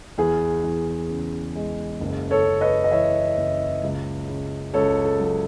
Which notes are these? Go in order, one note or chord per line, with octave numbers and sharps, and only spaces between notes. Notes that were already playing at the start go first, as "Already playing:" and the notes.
E2 G#4
E2
C#3
G#3
F#1
A4 C#5
F#1
B4 D#5
D#5
E3 C#5 E5
F#1
C#2
C#3
C#2 A4 C#5
A4
F#3 A4